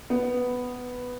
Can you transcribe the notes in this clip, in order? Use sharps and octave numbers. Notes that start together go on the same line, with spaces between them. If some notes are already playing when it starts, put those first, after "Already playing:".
B3